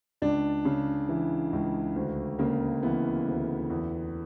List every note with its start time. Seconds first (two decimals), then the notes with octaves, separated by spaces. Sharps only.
0.22 C#2 D4
0.65 C#3
1.09 E3
1.53 C#2
1.96 D2
2.39 C#3 A#3
2.83 E3 B3
3.26 D2
3.70 E2